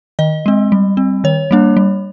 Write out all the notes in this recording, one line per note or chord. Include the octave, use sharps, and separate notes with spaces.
D#3 D#5
G#3 C4
G3
C4
D#3 C#5
G3 A#3 D4
G3